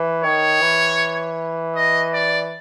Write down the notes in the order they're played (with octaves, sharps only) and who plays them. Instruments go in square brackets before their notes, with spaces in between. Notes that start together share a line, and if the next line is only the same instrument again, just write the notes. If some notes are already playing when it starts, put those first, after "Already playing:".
Already playing: [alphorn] E3
[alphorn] D#3 [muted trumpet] C#5
[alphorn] E3
[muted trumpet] D#5
D5